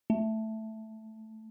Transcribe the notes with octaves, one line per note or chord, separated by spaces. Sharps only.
A3